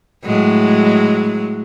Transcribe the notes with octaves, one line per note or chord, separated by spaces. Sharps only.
A2 F#3 G#3